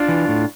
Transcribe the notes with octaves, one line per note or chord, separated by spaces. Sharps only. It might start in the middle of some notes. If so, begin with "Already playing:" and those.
Already playing: D4 F4
E3
A2